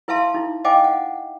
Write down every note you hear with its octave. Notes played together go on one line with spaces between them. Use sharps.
E4 B4 E5 F5 A5 C6
D#4 E4
C5 D#5 F5 G5 G#5 D6
F#5